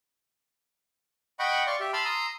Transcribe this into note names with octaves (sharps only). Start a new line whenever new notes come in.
D#5 F#5 G5 B5 C#6
D5 F5 C6 C#6
G4 E5
A5 B5 C6 E6 F6
A#5 C6 D#6 E6